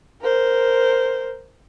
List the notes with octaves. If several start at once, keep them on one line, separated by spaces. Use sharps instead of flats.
A#4 C5